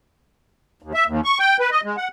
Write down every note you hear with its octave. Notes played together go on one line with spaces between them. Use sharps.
D#2
E5
D#2
C#6
G5
B4
D#5
G#3
F#5